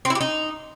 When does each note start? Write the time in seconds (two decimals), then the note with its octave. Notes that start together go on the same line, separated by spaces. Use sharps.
0.05 C4
0.10 E4
0.15 G4
0.21 D#4